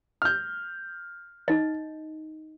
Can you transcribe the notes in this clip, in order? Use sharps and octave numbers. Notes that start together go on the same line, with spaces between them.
F6 G6
D#4 D#5